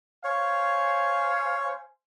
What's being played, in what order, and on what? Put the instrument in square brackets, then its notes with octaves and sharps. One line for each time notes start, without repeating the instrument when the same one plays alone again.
[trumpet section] C5 F5 G#5 [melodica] C#5